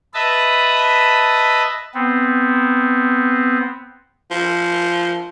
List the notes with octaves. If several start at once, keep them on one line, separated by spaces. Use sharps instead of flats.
B4 D#5 E5 A5 B5
B3 C4
F3